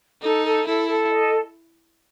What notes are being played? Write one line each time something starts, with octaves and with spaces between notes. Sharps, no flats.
D#4 A4
A4
E4 A4
A4
D#5